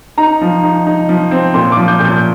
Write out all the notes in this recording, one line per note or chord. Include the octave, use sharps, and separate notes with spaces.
D#4 A#5
F3
D#4
D#4
F3
C4
A#2 C6
D6
F3
G6
A#2
G6